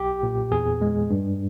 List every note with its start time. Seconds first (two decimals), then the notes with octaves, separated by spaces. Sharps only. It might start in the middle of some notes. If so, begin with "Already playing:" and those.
Already playing: B1 G4
0.23 A#2
0.51 E2 G#4
0.81 G#3
1.10 G2